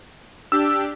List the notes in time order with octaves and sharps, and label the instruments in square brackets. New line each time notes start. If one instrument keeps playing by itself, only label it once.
[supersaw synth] D4 G4 [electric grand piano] E6